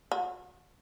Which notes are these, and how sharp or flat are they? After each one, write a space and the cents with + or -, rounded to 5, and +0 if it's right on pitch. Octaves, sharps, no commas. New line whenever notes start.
F#4 -35 B5 +0